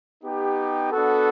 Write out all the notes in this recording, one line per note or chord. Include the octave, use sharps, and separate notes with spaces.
B3 D#4 G4
B3 D4 F#4 A4